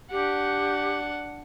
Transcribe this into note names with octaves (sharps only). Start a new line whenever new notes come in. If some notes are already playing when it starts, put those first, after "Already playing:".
D4 G4 F#5